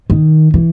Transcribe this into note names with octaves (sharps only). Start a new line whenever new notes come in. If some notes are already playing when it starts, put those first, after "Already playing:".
D#3
E3